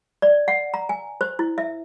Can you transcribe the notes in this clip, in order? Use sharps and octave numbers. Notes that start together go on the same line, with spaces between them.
D5
F#5
A#5
G#5
C5
E4
E5